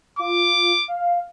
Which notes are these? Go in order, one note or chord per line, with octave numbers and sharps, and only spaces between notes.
F4 D6
F5